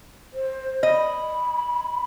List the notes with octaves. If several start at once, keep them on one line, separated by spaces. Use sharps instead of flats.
C5
D#5 B5